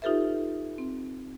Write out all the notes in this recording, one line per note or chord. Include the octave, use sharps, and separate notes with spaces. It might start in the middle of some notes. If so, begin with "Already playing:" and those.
D#4 F4 G4 A4 B4 E5
C4